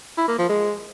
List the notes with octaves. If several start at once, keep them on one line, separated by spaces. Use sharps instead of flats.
E4
A#3
F3
G#3